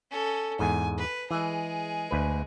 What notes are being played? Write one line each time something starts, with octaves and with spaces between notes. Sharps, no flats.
C#4 A4
E2 G#2 G#5
B4
E3 G#3 G#4
D2 B4